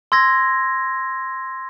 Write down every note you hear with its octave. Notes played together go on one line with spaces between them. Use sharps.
C6 E6 G#6 A#6